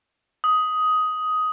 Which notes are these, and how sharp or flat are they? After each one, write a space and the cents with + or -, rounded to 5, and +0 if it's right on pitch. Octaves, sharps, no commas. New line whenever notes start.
D#6 +10